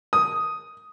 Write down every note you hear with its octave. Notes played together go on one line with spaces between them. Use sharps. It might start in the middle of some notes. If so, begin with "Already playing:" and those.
D#6